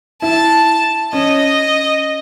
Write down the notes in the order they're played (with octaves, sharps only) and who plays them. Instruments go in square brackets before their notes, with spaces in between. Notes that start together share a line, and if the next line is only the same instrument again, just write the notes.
[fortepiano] E4 [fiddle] A5
[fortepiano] C#4 [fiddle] D#5